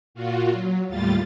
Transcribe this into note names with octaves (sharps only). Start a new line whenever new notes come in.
A#2 F4 F#4
F#3
D#2 A2 G3 F4 A6